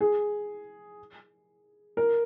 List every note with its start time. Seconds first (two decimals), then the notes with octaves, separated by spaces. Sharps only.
0.01 G#4
1.97 A#4